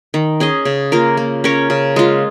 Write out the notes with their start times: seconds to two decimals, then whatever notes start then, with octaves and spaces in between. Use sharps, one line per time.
0.14 D#3
0.40 C#4 G#4 D#5
0.65 C#3
0.92 A#3 F4 A#4
1.17 A#3
1.44 C#4 A#4 C#5
1.70 C#3
1.96 G#3 F4